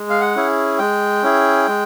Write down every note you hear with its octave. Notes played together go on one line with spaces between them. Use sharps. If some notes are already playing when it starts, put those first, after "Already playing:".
Already playing: G#3
F5
F#5
C#4 E4 G#4
G#3 G5
C#4 E4 G#4
G#3